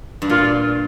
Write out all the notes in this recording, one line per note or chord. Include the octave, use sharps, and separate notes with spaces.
G2
A#2 F4